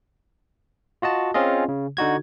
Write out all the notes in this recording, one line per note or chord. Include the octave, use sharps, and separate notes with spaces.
F4 F#4 D#5 A5
C4 C#4 F4 G#4 D#5
C#3
D3 D#4 F#4 G#6